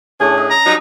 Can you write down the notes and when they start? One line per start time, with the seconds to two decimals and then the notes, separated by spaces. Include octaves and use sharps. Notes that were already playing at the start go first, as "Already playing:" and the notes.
0.20 A2 C#4 D4 G#4 A4
0.38 D#5
0.50 A#5
0.66 F#3 G3 D#4